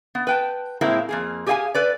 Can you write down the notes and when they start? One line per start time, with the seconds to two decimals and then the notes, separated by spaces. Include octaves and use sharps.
0.15 B3
0.27 B4 G5 A5
0.81 A2 G#3 A#3 C4 E4
1.09 F2 A#3 G#4
1.46 G4 G#4 C#5 E5 F5 G#5
1.75 A4 B4 D5